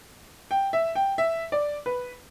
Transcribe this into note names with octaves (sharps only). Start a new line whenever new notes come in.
G5
E5
G5
E5
D5
B4